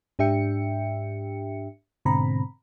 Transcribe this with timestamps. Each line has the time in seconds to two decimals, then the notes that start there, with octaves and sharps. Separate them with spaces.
0.19 G#2 D4 G4 E5 G5 C#7
2.05 G#2 B2 D3 C4 A#5 B5